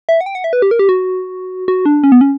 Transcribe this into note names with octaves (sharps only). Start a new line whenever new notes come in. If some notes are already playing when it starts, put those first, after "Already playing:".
E5
F#5
G5
F#5
E5
B4
G4
A#4
G4
F#4
F#4
D4
C#4
B3
C#4